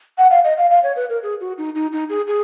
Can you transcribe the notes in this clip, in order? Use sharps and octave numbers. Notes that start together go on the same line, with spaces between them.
F#5
F5
D#5
F5
F5
C#5
B4
A#4
G#4
F#4
D#4
D#4
D#4
G#4
G#4